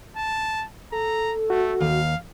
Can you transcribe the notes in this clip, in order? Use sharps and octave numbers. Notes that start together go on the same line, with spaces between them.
A5
A4 A#5
A3 F#4
D#2 F5